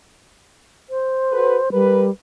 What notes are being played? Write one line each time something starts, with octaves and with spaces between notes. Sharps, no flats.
C5
F#4 A4 B4
G3 A#4 B4